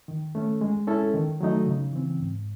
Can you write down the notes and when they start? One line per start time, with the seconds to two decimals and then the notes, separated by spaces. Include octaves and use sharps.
0.08 D#3
0.35 A3 C#4
0.61 G#3
0.87 C#4 E4 A4
1.14 D#3
1.41 F#3 A3 D#4
1.66 C#3
1.93 E3 C4
2.19 G#2